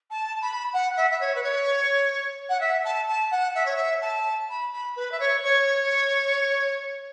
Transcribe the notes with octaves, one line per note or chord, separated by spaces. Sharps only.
A5
B5
F#5
E5
E5
C#5
B4
C#5
F#5
E5
A5
A5
F#5
E5
C#5
E5
A5
B5
B5
B4
E5
C#5
C#5